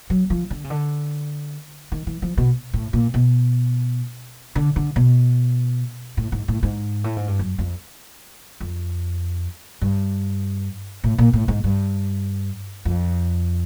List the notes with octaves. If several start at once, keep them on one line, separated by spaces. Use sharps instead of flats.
F#3
F3
D3
C#3
D3
D#3
E3
F3
B2
A2
A#2
B2
D3
D3
B2
A2
G#2
A2
G#2
A2
G#2
G2
F#2
F2
F2
G2
A2
A#2
A2
G#2
G2
F2